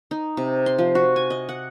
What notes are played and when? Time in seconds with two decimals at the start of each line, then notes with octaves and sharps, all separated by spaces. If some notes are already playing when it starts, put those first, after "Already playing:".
0.11 D#4
0.37 C3
0.66 C6
0.78 F3
0.95 F#4
1.16 G#5
1.30 D#5
1.49 F#5